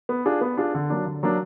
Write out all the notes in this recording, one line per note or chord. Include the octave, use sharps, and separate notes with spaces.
B3
D4 F4 G#4
B3
D4 F4 G#4
D3
F#3 A#3 D4
D3
F#3 A#3 D4